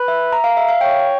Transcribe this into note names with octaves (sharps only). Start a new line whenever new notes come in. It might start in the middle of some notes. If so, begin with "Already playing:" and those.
Already playing: B4
E5
A#5
F5
E5
F5
C#5 G5